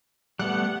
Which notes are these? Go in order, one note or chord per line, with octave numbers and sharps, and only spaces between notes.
G3 A3 B3 F#5